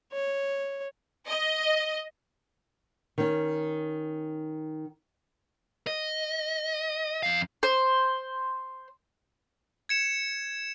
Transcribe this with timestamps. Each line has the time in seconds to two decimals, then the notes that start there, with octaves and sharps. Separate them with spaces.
0.13 C#5
1.27 D#5
3.18 D#3 C#4
5.87 D#5
7.23 F2 F5
7.63 C5
9.89 G#6 C#7 E7